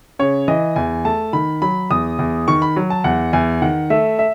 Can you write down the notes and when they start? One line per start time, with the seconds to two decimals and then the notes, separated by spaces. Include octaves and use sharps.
0.19 C#3 C#5
0.48 E3 D#5
0.76 E2 G#5
1.05 A3 A5
1.33 D#3 B5
1.62 F#3 B5
1.90 E2 D#6
2.19 E2
2.48 D#3 C#6
2.62 B5
2.76 F#3
2.90 A5
3.04 E2 F#5
3.33 E2 G#5
3.62 D#3 F#5
3.90 A3 E5
4.19 E5